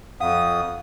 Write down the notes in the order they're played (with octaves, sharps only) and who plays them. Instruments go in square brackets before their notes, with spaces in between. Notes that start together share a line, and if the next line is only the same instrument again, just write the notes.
[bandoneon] F2 D#6 [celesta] F5 F#5